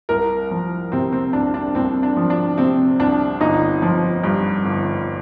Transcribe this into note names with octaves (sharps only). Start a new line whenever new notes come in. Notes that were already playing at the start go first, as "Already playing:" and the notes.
C2 A#4
F3
C3 C4
C4
C2 D4
D4
C2 C4
D4
F3
D4
C3 C4
C2 D4
G1 D#4
F3
G2
G1